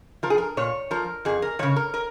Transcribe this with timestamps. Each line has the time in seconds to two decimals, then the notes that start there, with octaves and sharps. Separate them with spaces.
0.23 F3 A#4
0.30 G#4
0.38 A#4
0.57 A#2 C#5
0.91 F3 A#4
1.25 F2 G#4
1.42 A#4
1.59 C#3 F3 C#5
1.76 A#4
1.94 A#4